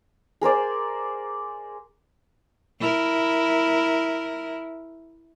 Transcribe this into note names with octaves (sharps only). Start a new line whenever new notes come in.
G#4 A#4 C5 D5
E4 A#4